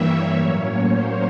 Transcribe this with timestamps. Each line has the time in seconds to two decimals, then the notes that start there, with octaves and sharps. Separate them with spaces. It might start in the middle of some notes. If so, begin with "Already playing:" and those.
Already playing: G2 E3 G3 A#3 C#5 E5
0.34 A2 F#3 A#3 C#4
0.77 C5